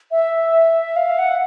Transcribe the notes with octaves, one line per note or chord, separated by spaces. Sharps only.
E5
F5
F#5